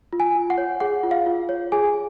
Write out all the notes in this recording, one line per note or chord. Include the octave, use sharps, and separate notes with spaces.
F4
G#5
F4
F#5
C#5
G#4 F#5
F4
F5
F4
C#5
G#4 G#5